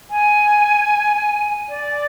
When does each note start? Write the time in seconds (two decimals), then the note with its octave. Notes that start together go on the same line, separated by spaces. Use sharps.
0.11 G#5
1.69 D5